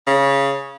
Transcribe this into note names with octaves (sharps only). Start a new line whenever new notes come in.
C#3